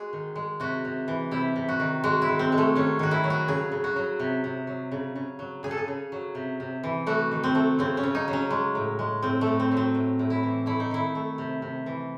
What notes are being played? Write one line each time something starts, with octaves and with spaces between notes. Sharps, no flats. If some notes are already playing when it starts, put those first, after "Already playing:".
Already playing: G#3 F#4 G#4
D#3
G#3
C3 F#4
C3
E3
C3 E4
C3
F#4
D#3
G#3 F#4
E4
D#3
C4
G#3
A3
D#3 C#4
D#3 F#4
E4
F#3
F#4
C#3 G#4
C#3
F#4
F#3
C3
C3
F#3
C#3
C#3
F#3
C#3 G#4
A4
G#4
C#3
F#3
C3
C3
E3
A3 F#4
D#3
C4
A3
C#3 C4
C#4
C#3
D#4
F#3
C#4
G#3
A2
G#3
A2 C4
A3
A2
C4
F#3
C4
A2
A2
E4
E3
A3 E4
D#4
D#3 E4
A3
C3
C3
E3